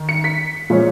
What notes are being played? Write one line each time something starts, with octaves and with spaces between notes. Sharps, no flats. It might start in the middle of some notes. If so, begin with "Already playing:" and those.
Already playing: D#3
C#7
B6
A#2 F3 G#3 C#4